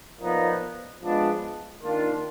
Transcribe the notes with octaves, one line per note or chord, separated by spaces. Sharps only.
A#2 F3 B3 D#4
F3 G#3 B3 D4 F4
D#3 A#3 D4 F4